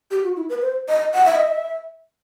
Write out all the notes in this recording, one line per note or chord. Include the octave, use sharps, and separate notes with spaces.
G4
F#4
E4
B4
C5
D#5
F#5
E5
D#5
E5